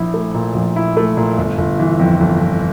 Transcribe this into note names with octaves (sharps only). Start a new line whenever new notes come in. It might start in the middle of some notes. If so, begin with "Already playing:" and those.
Already playing: A#1 E4
A3
A#2
A#1
E4
A3
A#2
G1
G1
E3
F2
G1
G1